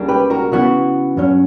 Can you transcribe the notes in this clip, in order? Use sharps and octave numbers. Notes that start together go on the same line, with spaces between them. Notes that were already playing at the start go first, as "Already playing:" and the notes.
Already playing: C#2 C#3 G3 A#3 D4
G4 B4
F#4 A#4
C#3 E3 B3 F#4
G2 F#3 C#4